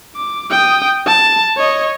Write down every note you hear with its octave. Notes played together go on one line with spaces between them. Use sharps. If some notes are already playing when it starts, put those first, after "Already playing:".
D6
G5 D#6
A5
C#5 D#5